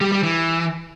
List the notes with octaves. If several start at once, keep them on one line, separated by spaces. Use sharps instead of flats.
G3
G3
E3